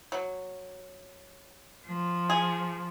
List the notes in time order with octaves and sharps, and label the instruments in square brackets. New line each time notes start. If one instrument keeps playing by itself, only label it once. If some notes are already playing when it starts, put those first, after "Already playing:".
[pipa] F#3
[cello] F3
[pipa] G#4